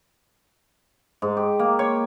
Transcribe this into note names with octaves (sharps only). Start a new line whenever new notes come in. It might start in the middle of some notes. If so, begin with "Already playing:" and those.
G#2
G4
A#3
C#5